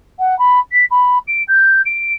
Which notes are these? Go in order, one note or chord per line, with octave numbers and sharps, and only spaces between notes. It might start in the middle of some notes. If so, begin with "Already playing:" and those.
F#5
B5
B6
B5
D7
G6
D7